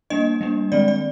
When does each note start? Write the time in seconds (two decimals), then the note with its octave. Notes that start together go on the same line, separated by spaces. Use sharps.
0.10 G3 A#3 D4 D#5
0.41 G3 A#3 D4
0.72 D#3 G#3 C4 D5
0.88 D5